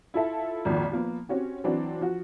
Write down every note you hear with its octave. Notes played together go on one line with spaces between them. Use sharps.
E4 F4 A4 E5 A5
G#1 F2 A#2 D#3
F3 A#3 B3
C4 C#4 F#4 G4
E3 F#3 C4 D4 F#4
F3 F#4